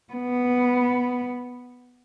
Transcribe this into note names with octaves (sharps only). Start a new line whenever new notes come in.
B3